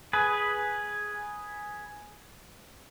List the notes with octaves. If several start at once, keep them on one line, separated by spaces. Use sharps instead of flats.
G#4 B4